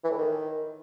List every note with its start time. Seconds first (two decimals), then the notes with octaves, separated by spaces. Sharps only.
0.04 E3
0.11 A2
0.18 D#3